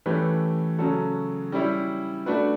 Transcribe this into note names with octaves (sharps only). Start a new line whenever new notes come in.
E3 A3 C#4 G4 B4
C#3 F#3 C#4 F#4 A4
G3 C#4 E4 G4
A3 D4 F#4 B4